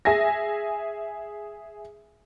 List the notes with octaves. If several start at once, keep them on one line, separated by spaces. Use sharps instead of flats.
G#4 E5 G#5 A#6